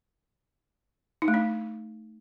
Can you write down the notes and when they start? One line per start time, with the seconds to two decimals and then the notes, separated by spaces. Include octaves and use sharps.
1.22 D#4
1.28 A3
1.34 D4